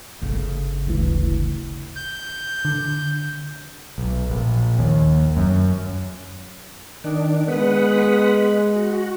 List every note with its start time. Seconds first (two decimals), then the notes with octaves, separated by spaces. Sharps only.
0.22 G1 C#3
0.87 D1 D2 E3
1.96 G6
2.65 D3
3.98 B1
4.30 A#1
4.79 D#2
5.37 F#2
7.04 D#3 D4
7.48 G#3 B3 B4 F#5
8.76 F#4